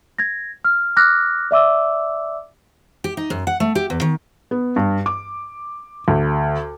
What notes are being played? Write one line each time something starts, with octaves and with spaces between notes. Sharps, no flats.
G#6 A#6
F6
D6 F6 F#6 A#6
D5 E5 D6 E6
G4
D#4
F#2
F#5
A3
G4
E2
D#3
B3
G2
D6
D2